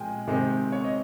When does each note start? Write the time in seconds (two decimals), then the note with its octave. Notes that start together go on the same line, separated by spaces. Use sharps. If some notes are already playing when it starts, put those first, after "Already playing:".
Already playing: A#2 F3 G#3 G5 G#5
0.27 C3 D#3 G#3 C4
0.72 C#5
0.85 D#5